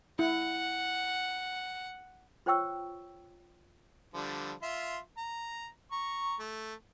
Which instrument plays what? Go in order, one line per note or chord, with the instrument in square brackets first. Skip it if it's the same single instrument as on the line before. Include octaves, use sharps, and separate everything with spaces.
[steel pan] E4 [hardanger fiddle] F#5
[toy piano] F4 C5 C#5 G5 C#6 E6
[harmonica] D3 F3 G3
F4 E5 C6
A#5
A#5 C#6
A3